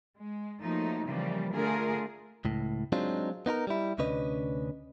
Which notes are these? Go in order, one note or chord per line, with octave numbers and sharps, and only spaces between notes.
G#3
F3 F#3 A3 A#3 D#4
C#3 E3 F3 G3 A#3
D3 A3 F4 G#4 A#4
C#2 A2
F#3 G#3 C4 D4 D#4 F4
B3 D#4 E4 A#4
G3 E4
D2 C3 C#4 D4 B4 D#5